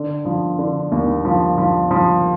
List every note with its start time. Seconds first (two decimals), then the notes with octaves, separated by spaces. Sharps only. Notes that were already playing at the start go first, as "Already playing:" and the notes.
Already playing: D3
0.25 F3
0.59 D3
0.92 D#2
1.25 F3
1.58 F3
1.91 F3